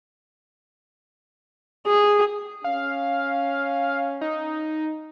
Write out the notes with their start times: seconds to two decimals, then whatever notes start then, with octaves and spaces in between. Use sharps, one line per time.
1.87 G#4
2.64 C#4 F5
4.21 D#4